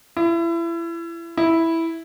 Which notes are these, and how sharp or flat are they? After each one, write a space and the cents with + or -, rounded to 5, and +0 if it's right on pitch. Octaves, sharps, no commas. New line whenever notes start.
E4 +30
E4 -5